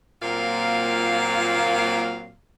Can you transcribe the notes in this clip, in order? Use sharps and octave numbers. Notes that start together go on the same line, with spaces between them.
A#2 F#3 A#3 C4 F4 F5